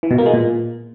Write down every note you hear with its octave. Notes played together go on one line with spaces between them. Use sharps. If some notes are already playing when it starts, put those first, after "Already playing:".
E3
B2
A#3
G#3
A#2